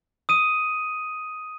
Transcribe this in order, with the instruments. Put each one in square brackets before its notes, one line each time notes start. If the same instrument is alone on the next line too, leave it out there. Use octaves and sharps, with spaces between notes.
[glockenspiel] D#6 D#7